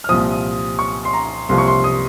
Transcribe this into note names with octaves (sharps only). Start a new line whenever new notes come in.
F6
C2 A#2 F3 D#6
C#6
C6
A#5
C2 C3 F3 A#3 C6
C#6
C6
D#6